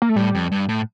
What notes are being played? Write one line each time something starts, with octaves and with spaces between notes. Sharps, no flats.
A#3
A3
A2 G3
F2
G2
A2